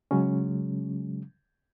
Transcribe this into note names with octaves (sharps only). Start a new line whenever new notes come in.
C#3 F#3 G#3 C#4